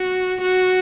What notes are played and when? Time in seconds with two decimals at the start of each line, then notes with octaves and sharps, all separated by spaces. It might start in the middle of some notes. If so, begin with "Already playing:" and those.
Already playing: F#4
0.42 F#4